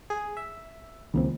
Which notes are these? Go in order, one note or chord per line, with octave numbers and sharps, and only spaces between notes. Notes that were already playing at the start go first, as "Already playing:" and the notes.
G#4
E5
C#2 D#3 A#3 C4